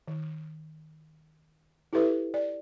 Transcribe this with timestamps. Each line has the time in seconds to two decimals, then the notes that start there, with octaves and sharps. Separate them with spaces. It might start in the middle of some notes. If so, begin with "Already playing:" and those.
0.08 D#3
1.93 E4 G4 A4 B4 E5
2.34 D5